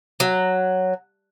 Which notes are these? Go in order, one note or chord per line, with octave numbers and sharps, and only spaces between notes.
F#3